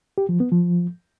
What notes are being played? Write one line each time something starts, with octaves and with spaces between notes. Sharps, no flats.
G4
F3
B3
F3